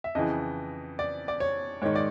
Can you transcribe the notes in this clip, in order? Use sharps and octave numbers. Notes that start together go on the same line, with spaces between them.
E5
F2 C#3 E3 D#5
D5
D5
C#5
G#2 D#3 C#5
D5